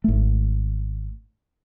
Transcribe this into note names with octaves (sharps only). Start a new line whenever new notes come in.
G#1 A3